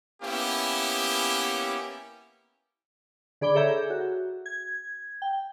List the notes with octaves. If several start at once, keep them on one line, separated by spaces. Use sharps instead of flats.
A#3 B3 C#4 E4 G4
D3 G#4 D5 B5 D6 G7
G#4 A4 C#5 E5 A#5 G6
F#4
G#6
G5